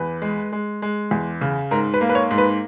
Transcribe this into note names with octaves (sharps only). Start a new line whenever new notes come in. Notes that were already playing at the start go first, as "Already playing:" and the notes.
Already playing: E2 B4
G#3
G#3
G#3
E2
C#3
G#2 A#4
B4
A#3
B4
C#5
G#2
B4